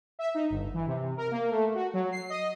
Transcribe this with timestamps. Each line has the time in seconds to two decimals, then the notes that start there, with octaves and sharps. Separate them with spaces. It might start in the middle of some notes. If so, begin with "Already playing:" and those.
0.19 E5
0.35 D#4
0.50 G1
0.74 E3
0.87 C3
1.17 A#4
1.31 A#3
1.51 A3
1.75 F#4
1.94 F#3
2.12 C7
2.30 D#5